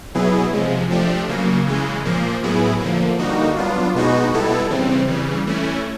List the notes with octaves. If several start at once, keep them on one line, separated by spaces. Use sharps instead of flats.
B2 F#3 B3 E4 G#4
C3 F3 G#3
F3 A3 D4 G4
C#3 F#3 A#3
C#3 E3 G#3
A#2 F3 A#3
A2 F#3 B3 E4 G#4
D3 F3 A#3
D3 G3 A#3 D#4 F#4
F#3 B3 D4 F4
B2 G#3 B3 D#4 F#4
B2 G3 B3 E4 A4
C#3 E3 G3 C4
C#3 E3 G3
E3 A3 C#4 E4